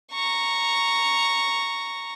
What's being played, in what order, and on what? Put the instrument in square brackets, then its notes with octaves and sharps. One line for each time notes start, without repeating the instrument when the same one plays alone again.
[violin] A#5 C#6